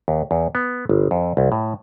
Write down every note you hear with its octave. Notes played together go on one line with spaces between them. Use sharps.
D#2
E2
B3
G1
F2
C2
A2